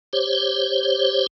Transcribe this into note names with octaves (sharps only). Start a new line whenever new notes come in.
G4 C5 C#5